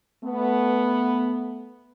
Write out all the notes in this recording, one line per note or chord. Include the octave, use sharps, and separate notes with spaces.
A3 B3